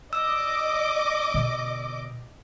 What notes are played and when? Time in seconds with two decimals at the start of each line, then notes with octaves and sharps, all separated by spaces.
0.13 D5 D#5 D6 E6
1.34 B2 D3